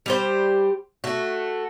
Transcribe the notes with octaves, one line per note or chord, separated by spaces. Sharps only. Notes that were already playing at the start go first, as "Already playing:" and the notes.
G3 G4 C5
A3 F#4